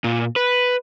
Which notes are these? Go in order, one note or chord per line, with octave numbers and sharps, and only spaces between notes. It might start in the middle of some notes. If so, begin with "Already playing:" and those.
A#2
B4